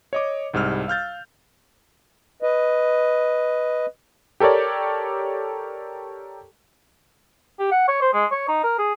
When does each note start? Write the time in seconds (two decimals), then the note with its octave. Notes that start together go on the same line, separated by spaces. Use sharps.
0.13 C#5 D#5 D6
0.54 C2 G#2 G3 E6 F6
0.88 F5 F6 G6 A6
2.42 B4 D#5
4.40 G4 A4 A#4 C#5 D5
7.59 G4
7.72 F#5
7.88 C#5
8.01 C5
8.13 G#3
8.31 C#5
8.48 D#4
8.64 A#4
8.79 G#4